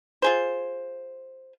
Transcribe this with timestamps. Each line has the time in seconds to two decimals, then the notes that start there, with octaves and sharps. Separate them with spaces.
0.22 F4 G#4 C5